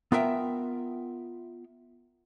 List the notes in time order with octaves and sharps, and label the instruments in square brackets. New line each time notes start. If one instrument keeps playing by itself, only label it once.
[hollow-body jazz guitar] B3 F4 A#4 E5 G5